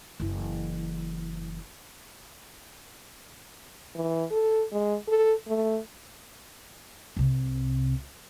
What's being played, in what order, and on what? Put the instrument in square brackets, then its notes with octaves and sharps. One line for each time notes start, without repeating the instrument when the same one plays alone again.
[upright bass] F#1 E3
[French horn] E3
A4
G#3
A4
A3
[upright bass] C2 C3